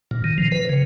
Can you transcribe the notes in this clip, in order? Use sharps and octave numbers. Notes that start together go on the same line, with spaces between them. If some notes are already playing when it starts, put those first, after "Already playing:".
A#2
D#3
F3
B4
C#3